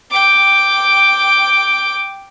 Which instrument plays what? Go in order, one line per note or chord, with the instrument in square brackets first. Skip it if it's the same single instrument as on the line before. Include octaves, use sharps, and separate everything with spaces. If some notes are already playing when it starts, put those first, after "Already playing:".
[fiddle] G5 D6